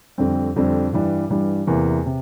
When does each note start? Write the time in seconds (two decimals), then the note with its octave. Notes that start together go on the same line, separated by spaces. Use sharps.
0.18 F2 D3 G3 C4
0.56 F2 D3 G3 C4
0.93 G2 E3 G3
1.30 G2 E3 G3
1.67 E2 C3 E3 A#3
2.06 C3